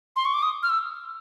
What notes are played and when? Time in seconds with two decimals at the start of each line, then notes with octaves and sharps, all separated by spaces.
0.16 C6
0.25 C#6
0.34 D6
0.43 D#6
0.63 F6
0.69 E6